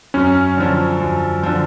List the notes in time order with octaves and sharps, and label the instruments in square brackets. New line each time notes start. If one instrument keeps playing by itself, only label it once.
[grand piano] F#2 [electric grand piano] C#4
[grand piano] D3 F3
F#2
D3 F3